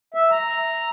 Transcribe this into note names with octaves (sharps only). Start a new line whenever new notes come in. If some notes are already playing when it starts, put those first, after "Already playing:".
E5
A#5